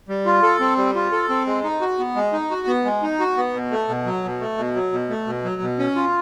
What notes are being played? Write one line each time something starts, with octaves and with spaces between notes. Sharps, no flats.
G3
F4
A4
C4
G3
F4
A4
C4
G#3
D#4
F#4
B3
G#3
D#4
F#4
B3
G#3
D#4
F#4
B3
B2
A3
B2
F#3
B2
A3
B2
F#3
B2
A3
B2
F#3
B2
C#4
F4